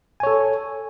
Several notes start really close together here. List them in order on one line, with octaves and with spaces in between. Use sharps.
G#5 C#5 A4